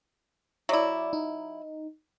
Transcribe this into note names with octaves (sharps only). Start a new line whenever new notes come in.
F#3 E4 D5 E5
D#4